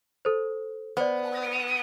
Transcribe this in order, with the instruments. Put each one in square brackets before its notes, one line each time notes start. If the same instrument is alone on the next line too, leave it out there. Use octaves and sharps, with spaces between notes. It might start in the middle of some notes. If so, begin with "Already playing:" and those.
[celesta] A4 C5
[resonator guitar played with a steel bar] B3 [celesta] C5 D5